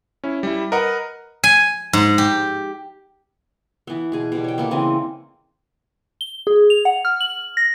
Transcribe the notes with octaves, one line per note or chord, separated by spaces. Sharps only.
C#4 E4
G3 E4
A#4 B4 D#5 F#5
G#5
G#2
G4
E3 B3
B2 G#4
B2 G3
C#5 G5
A#3 B3 A4
C#3 E3 C4 D#5
G7
G#4
F7
F#5
F6
F#7
A#6